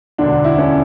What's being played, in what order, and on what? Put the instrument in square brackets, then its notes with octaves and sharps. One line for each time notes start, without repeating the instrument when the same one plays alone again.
[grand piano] E1 D2 D3 D4
E4
C#4